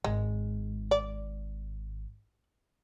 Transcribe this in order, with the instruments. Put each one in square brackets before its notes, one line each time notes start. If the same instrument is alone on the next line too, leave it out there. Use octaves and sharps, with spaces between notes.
[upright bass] G#1 [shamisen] G#3
[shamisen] D5